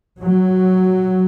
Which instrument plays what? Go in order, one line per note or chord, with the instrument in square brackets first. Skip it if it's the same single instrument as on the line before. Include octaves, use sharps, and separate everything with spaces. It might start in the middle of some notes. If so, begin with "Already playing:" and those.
[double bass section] F#3